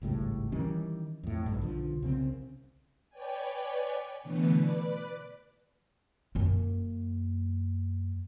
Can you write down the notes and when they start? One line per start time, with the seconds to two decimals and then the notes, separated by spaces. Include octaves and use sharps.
0.02 G#1 C#2 A2 G3
0.52 D#3 E3 G3 C#4
1.23 F2 A2
1.46 B1 G2
1.62 B1 D3 F3
2.03 C2 C#3 C4
3.10 B4 C#5 D5 G5 G#5
4.23 B2 D3 E3 A3 B3
4.52 B4 D5
6.35 F#2 A#3